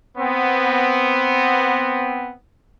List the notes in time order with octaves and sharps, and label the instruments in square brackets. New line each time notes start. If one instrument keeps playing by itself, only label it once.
[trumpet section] B3 C4